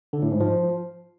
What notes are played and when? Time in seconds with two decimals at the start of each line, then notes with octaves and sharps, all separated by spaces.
0.13 D3
0.22 A2
0.31 G#2
0.40 F3